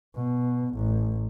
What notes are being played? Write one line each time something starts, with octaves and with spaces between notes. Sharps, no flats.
B2
A1